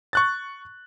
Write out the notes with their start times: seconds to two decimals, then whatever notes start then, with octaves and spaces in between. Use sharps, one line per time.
0.13 C#6 F#6 A6